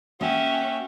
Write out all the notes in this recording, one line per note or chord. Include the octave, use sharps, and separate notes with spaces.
A#3 C#4 F#4 E5 G5